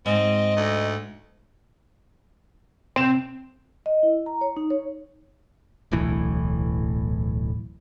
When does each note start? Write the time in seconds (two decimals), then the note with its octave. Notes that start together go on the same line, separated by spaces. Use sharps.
0.06 G#2 C4 D#5
0.56 D2
2.96 C3 C4 E7
3.86 D#5
4.03 E4
4.26 A#5
4.41 C#5
4.57 D#4
4.70 C#5
5.92 D1 B1 A2 E3